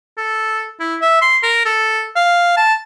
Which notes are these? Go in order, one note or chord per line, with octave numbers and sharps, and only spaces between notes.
A4
E4
E5
C6
A#4
A4
F5
A5